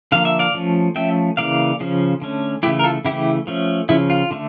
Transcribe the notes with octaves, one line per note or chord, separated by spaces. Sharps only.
D3 F3 A#3 F5
E5
D5 F5
F3 A3 C#4
F3 A3 C#4 E5 G5
C#3 E3 G3 A#3 D5 F5
C#3 F3 C#4
D3 A3 C#4
C#3 E3 A3 E4 G4
A#4
F4 A4
C#3 E3 A3 E4 G4
F3 A3 C#4
C#3 F3 C#4 E4
F4
D3 A3